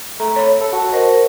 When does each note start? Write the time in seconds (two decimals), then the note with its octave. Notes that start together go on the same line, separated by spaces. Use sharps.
0.20 A3 A#5
0.36 C#5 B5
0.61 A4
0.73 F#4 A5
0.93 A#4 C5 D#5